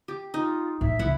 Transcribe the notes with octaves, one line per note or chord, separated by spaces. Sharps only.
G4
D#4 F4
A2 E5
C#2 E4 F#5